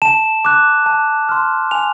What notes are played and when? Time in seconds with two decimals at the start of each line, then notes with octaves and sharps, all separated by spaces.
0.02 A5 E7
0.45 D6 F#6
0.86 A5
1.29 C6 F6
1.71 G#5 F7